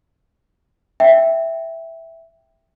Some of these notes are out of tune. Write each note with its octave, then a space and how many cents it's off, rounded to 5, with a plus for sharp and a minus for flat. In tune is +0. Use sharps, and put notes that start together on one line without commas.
E5 +0 G5 +0